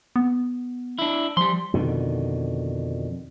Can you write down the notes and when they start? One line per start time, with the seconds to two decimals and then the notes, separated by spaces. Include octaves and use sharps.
0.16 B3
0.99 D4 E4
1.37 F3 G3 C6
1.74 F2 B2 D3 D#3